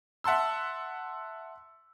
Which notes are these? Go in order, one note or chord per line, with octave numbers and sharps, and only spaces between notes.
E5 F#5 A5 C6 E6